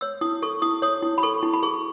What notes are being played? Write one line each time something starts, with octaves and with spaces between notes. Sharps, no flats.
C#5 E6
E4 D#6
A4 C#6
E4 D#6
C#5 D#6
E4
B5
A4 C#6
E4
B5
G#4 C#6